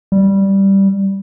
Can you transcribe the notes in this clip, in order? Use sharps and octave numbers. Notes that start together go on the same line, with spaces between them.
G3